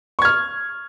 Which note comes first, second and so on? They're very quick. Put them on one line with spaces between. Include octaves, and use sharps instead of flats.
C#6 G#6 F6